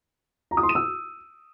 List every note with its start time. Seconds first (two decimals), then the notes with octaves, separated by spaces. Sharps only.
0.51 A#5
0.57 D#6
0.63 C6
0.69 D#7
0.75 E6